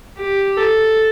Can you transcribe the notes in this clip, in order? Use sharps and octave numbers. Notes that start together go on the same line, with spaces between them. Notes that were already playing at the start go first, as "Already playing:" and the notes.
G4
A4